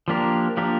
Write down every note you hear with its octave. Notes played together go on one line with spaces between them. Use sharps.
F3 A#3 D4 G4 A#4
F3 A#3 D4 G4 A#4